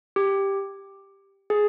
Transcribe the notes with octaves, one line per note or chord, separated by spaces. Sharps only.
G4
G#4